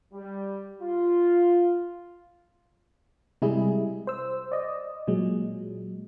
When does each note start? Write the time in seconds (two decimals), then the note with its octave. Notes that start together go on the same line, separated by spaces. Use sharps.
0.14 G3
0.81 F4
3.42 C3 G3 G#3 E4 G#4
4.07 C5 E6
4.52 D5 D#5
5.07 A#2 F#3 G#3